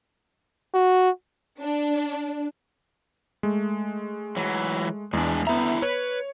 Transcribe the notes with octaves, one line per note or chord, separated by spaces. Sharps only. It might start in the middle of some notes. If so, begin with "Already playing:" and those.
F#4
D4
G#3 A3
E3 F#3
E2 G#3 D4
D3 B3 E4 E5 A#5
B4 C#5